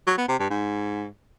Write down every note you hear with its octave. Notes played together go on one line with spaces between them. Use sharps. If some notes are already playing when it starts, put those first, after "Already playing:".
F#3
B3
C3
G2
G#2